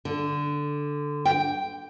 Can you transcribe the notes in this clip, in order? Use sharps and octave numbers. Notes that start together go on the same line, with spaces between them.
D3
G5